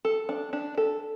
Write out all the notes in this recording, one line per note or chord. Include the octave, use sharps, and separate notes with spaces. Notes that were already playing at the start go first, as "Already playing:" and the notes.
A4
D4
D4
A4